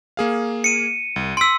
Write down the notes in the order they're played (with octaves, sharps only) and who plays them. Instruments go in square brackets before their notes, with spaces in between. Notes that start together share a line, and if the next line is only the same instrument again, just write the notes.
[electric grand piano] A#3 G#4 F5
[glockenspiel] C#7 D#7
[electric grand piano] C2
[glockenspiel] C6 E6 [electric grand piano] B6 D7